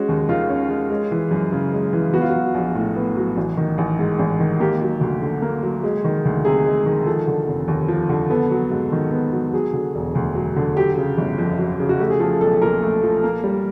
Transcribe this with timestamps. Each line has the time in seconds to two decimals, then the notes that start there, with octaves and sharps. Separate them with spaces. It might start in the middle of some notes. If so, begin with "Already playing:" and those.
Already playing: G#3 C#4 F#4
0.09 D#2
0.29 D#3 F4
0.49 C#4
0.69 G#3
0.90 G#3
1.11 E3
1.31 F#2
1.53 C#3
1.72 G#3
1.93 E3
2.13 B3 F#4
2.21 F4
2.30 F#3 F#4
2.54 A#1
2.75 A2
2.96 B3
3.17 F#3
3.37 A1
3.57 D#3
3.78 A1
3.99 G#2
4.19 A1
4.40 D#3
4.60 A#3 G4
4.81 F#3
5.01 D2
5.22 D3
5.42 A#3
5.63 F#3
5.83 G#3
6.04 D#3
6.25 D2
6.45 C3 G#4
6.66 G#3
6.86 D#3
7.06 F3 A4
7.27 D3
7.48 F1
7.68 D#2
7.88 F3
8.09 D3
8.30 B3 A4
8.51 F#3
8.71 G#2
8.92 D#3
9.12 B3
9.32 F#3
9.54 F#3 G#4
9.73 D3
9.95 E1
10.15 D2
10.35 F#3
10.56 D3
10.76 F#3 G4
10.97 C#3
11.18 G1
11.38 F2
11.59 F#3
11.80 C#3
11.89 F#4
12.00 A3 G4
12.10 G#4
12.20 F3 A4
12.41 B1 A4
12.62 A#2 A#4
12.82 A3
13.03 F3
13.24 A#3
13.44 G3